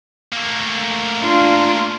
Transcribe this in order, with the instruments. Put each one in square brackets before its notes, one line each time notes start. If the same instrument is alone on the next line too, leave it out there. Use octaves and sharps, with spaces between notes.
[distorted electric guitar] A3 A#3
[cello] D4 F4